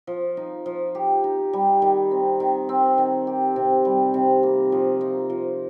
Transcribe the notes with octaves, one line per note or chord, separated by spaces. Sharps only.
F3
D#4
F3
G4
D#4
G3
D#3
C4
D#3
C4
D#3
G4
C3
G3
C3
A#3
F3
D#4
F3